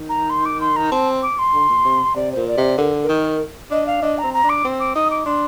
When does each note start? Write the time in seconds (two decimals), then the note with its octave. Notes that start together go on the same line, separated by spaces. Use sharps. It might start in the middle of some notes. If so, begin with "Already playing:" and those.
Already playing: D#3
0.09 A#5
0.29 C6
0.45 D6
0.60 C6
0.76 A#5
0.91 C4 A5
1.22 D6
1.38 C6
1.54 D3
1.69 A#2
1.85 C3
2.15 C3 D5
2.32 A#2 C5
2.47 D5
2.57 C3 D#5
2.62 D5
2.78 D3 A#4
3.03 A#4
3.09 D#3
3.71 D4 D#5
3.86 F5
4.02 D4 D#5
4.18 A#5
4.23 C4
4.33 A#5
4.44 D4
4.49 D6
4.65 C4
4.79 D6
4.95 D#4 D#6
5.10 D6
5.26 D4 C6